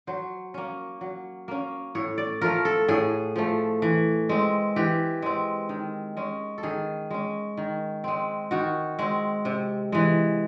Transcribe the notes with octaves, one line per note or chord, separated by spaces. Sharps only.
F#3 C5
A#3 C#4
F#3
A#3 C#4
A2 C#5
D5
F3 A3 A#4
A4
A2 G#4
F3 A3
E3
G#3 C4
E3 G4
G#3 C4
D#3
G#3 C#4
A4
D#3 G#4
G#3 C#4
D#3
G#3 C4
D#3 F#4
G#3 C4
C3
E3 G#3